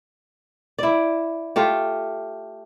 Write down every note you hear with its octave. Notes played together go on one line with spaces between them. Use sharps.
E4 D5
A3 F4 G4